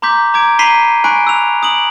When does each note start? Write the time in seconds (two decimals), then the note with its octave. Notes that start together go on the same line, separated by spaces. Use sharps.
0.02 A#5 C6 D6 G6 B6
0.34 A#5 D6 G#6 D7
0.59 A#5 B5 B6 C7 D#7 G7
1.04 G#5 B5 C#6 F#6 D7
1.27 E6 F7
1.63 D#6 D7 F#7